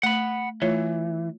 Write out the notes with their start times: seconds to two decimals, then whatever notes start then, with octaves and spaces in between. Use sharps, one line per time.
0.03 A3 F#5 B5
0.62 E3 A3 F4 C#5